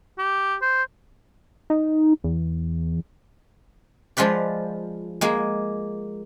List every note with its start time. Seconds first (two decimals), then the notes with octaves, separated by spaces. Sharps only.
0.18 G4
0.62 C5
1.70 D#4
2.24 E2
4.17 F3 G#3 F4 B4 D5
5.21 G#3 A#3 G#4